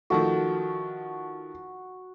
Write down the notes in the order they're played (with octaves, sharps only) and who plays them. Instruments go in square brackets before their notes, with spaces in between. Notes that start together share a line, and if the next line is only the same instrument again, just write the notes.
[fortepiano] D#3 F3 A3 [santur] F#4